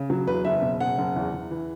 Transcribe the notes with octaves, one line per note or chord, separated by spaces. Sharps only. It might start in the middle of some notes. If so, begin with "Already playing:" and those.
Already playing: C#3
F#3
E2 B4
F#1 E5
B2
F#1 F#5
F#1
E2
E2
E3